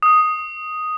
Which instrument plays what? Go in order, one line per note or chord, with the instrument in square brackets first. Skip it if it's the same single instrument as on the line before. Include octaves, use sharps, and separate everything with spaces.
[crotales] D#6